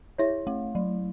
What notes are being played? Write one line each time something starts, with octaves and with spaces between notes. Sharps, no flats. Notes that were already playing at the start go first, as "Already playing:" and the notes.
E4 C#5 E5
A3
F#3